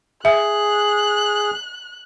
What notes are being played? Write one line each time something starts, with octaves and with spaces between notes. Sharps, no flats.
G#4 E5 F#6